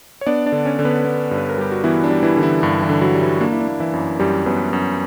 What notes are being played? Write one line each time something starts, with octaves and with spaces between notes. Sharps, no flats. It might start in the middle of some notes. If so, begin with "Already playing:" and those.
C#5
B3 D4 D5
D4 D5
D3
C#4 C#5
D3
B3 B4
B3
G2
B4
A#4
G3 G4
F#4
E3 B3 E4
D4
G3
E3 E4
D3
E3 E4
G2 D4
E3 E4
D3
F#3 F#4
G3
E3 E4
A#3 D4
E4
D4
A#3
E3 E4
F#2
F#2 G3 G4
F#2 B3 B4
F#2